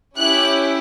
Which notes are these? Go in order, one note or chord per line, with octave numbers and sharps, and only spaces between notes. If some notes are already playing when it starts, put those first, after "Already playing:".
C#4 E4 G4 F#6